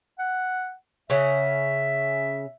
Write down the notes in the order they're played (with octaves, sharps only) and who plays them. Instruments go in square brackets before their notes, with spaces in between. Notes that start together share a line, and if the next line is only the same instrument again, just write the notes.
[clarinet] F#5
[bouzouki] C#3 C#4 F#5 [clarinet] E5